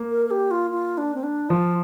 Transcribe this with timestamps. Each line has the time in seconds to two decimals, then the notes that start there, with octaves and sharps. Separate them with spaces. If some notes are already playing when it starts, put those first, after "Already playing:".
Already playing: A#3
0.11 A#4
0.25 A#4
0.31 G4
0.51 F4
0.71 F4
0.97 D4
1.15 C4
1.23 D4
1.49 F3 F4